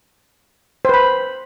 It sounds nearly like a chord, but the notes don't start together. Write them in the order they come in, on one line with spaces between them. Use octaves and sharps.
C5 B4 B5